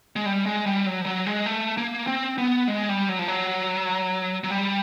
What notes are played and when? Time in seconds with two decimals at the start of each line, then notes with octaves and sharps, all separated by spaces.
0.16 G#3
0.26 G3
0.46 G#3
0.66 G3
0.86 F#3
1.01 F3
1.06 F#3
1.26 G#3
1.46 A3
1.77 A#3
2.07 C4
2.38 B3
2.68 G#3
2.89 G3
3.09 F#3
3.19 F3
3.28 F#3
4.44 F#3
4.51 G3